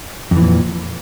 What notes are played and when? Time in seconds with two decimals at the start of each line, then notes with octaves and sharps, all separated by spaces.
0.31 F2
0.36 E3
0.41 A#2